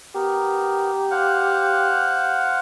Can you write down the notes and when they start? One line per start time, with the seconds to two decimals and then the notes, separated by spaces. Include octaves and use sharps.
0.15 B3 G4 A#4
1.11 C5 F5 F#5